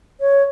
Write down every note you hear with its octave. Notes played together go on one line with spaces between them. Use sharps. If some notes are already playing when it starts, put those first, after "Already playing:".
C#5